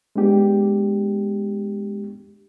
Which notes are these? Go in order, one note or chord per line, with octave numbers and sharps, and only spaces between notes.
G#3 B3 D4 G4